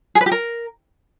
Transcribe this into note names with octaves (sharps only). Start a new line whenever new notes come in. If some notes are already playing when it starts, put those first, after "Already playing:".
G#4
B4
G4
A#4